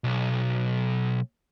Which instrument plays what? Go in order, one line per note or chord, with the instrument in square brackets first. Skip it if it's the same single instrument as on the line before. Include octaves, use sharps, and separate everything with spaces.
[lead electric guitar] B1